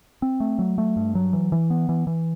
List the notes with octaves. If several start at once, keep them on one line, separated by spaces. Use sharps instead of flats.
C4
A3
F#3
A3
G2
F#3
E3
E3
B3
E3
E3